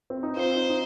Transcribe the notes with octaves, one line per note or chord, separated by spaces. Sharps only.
C4
D#4
C4 F4 C5
D#4
D#4